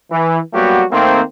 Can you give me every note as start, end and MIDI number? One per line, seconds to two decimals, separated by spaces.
0.11 0.39 52
0.53 0.83 54
0.53 0.83 55
0.53 0.83 58
0.53 0.83 59
0.53 0.83 66
0.53 0.83 67
0.91 1.21 51
0.91 1.21 57
0.91 1.21 58
0.91 1.21 60